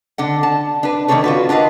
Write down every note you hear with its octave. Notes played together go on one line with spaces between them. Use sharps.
D3 D4 F#5
A5
D4 B4
D#3 E3 A#3 D4 A4 C#5
F4 F#4 B4
D4 F4 A#4 B4 D#5